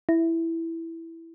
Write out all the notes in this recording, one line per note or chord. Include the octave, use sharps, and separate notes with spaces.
E4